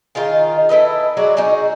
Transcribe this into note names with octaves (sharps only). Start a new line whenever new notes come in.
D#3 D#4 F4 G#4
E4 A4 B4 D#5
F#3 G#3 F#4 D5
D#4 F#4 G#4